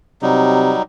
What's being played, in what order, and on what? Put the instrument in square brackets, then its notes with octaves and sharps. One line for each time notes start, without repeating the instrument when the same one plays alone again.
[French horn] C3 [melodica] F#3 G3 D#4